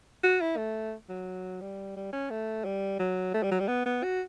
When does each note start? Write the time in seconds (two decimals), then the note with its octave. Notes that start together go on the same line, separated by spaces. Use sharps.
0.23 F#4
0.40 E4
0.57 A3
1.09 F#3
1.61 G3
1.96 G3
2.13 C#4
2.30 A3
2.65 G3
2.99 F#3
3.34 A3
3.43 G3
3.51 F#3
3.60 G3
3.68 B3
3.86 B3
4.03 F#4